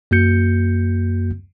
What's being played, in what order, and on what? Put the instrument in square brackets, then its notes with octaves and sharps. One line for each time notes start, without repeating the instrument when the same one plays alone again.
[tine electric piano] F#2 A#3 F#4 G6 C#7